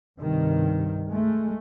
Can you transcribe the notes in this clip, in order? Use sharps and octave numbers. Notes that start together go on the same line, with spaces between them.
C2 G2 C3 D#3
G#3 A3